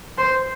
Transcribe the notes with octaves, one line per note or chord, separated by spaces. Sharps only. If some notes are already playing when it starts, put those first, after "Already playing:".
C5